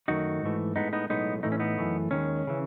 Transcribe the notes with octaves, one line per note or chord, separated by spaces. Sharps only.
F#2 D#3 A3 D#4 F#4
G#2 E3 A3
A2 G#3 B3 D#4
B3 D#4
B1 A2 G#3 B3 D#4
A2 E3 A3 D#4
C#4
B3 D#4
F#2 E3 A3
D#2 D#3 G#3 C#4
C#3 E3